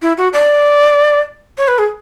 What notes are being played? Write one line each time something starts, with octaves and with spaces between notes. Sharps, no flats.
E4
F#4
D5
C#5
B4
G#4